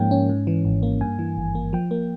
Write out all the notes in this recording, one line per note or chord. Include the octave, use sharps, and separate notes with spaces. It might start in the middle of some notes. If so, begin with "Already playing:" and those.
Already playing: G#2 F3 A#3 C#4 G5
C#4
G#2
E3
G#1
A#3
G2 G#5
E3
G#1
A#3
F3 G5
A#3